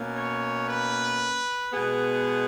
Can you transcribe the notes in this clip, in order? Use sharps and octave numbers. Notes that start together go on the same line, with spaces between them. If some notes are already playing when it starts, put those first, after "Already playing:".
Already playing: B2 A#3 C#4
C#5
B4
B2 G#3 B3 G#4